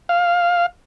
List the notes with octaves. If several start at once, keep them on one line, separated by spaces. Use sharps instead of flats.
F5